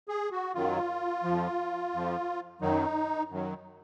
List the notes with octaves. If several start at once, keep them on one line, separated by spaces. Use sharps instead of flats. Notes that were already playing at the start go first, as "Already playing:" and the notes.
G#4
F#4
F#2 D#3 F#3 F4
F2 F3
F2 F3
F#2 D#3 F#3 D#4
F#2 D#3 F#3